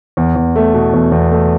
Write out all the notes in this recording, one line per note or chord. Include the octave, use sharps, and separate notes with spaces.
E2
E2
A3
B2
E2
E2
A3